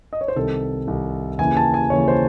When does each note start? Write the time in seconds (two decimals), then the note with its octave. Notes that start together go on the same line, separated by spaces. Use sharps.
0.13 D#5
0.21 C#5
0.28 C5
0.36 C2 C3 D#3 A4
0.87 C2 C3 D#3
1.38 D#2 C#3 E3 G#5
1.57 A5
1.74 G#5
1.90 D#2 C#3 E3 C#5
2.08 C5